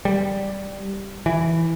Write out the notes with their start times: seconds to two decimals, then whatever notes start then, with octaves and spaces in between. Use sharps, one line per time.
0.05 G3
1.26 E3